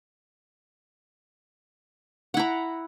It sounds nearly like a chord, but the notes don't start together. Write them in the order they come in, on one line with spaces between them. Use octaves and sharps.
F#5 E4 A#5